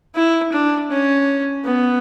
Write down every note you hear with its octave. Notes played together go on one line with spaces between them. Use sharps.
E4
D4
C#4
B3